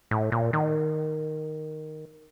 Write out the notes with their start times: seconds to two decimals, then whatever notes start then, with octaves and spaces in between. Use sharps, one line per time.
0.11 A2
0.32 A#2
0.53 D#3